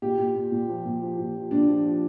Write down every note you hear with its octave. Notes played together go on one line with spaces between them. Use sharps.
A#2 G4
A#2
A#2
A#2
F3
A#2
F3
A#2
F3
A#2 D4
F3
F3